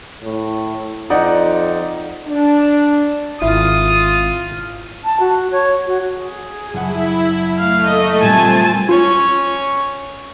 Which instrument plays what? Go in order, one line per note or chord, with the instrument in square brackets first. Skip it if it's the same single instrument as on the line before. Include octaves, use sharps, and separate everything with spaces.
[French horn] A2
[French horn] F2 [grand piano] D#4 D5 F#5
[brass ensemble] D4
[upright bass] G#1 [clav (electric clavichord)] E4 [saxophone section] F4 [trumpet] D#6
[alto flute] A5
F#4
C#5
F#4
[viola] G#4
[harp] F#1 F#5 [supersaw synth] E4
[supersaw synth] A3 [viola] F5
[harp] A#3 [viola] A4 D#5
[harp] A#2 G3 [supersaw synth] C4 [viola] G#5 A5
[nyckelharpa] C#4 C#5 [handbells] F4